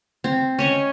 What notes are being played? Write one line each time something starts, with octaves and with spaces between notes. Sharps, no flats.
C4
C#4 C#5 D#5